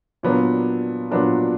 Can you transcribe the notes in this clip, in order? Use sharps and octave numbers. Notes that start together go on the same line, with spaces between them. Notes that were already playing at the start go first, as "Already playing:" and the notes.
A#2 F#3 B3 D4 A#4
A#2 F#3 B3 D4 A#4